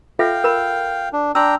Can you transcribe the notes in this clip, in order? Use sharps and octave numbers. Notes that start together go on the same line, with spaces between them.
F4 A4 E5 F5 G5
A#4 B5
D4
D4 G5 A#5 C6 E6